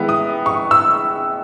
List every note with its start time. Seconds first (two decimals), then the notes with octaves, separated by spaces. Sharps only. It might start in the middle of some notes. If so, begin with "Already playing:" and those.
Already playing: D#3 G#3 B3 E4
0.09 D#6
0.46 C#6
0.71 E6